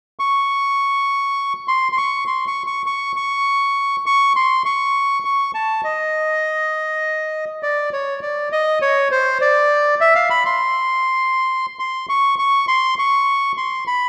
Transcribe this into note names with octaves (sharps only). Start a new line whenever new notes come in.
C#6
C6
C6
C#6
C6
C#6
C#6
C#6
C#6
C#6
C6
C#6
C#6
A5
D#5
D5
C#5
D5
D#5
C#5
C5
D5
E5
F5
B5
C6
C6
C#6
C#6
C6
C#6
C6
B5